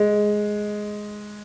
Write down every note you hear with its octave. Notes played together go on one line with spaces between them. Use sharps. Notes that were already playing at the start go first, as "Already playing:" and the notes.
Already playing: G#3